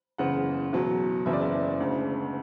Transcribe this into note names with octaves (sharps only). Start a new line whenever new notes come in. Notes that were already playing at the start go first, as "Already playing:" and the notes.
F#1 E2 C#3 F#5
E2 B2 F#3
F#1 E2 C#3 E5
D5
E5
E1 D2 C#3